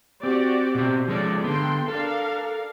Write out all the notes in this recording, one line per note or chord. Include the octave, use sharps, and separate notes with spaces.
C4 F#4 G4 D5
B2 C4
F3 G#3 C#4 A4 D5
D3 B3 A4 G5 C6
D4 A4 A#4 F5